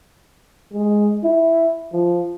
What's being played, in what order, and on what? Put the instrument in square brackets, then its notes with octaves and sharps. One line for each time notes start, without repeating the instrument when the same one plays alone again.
[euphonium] G#3
E4
F3